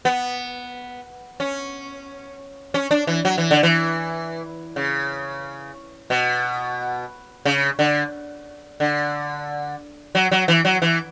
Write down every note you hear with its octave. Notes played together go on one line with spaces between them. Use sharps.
B3
C#4
C#4
D4
E3
F#3
E3
D3
E3
C#3
B2
C#3
D3
D3
F#3
F#3
E3
F#3
E3